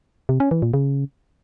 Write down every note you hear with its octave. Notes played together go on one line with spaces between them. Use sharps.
C3
C#4
E3
A#2
C#3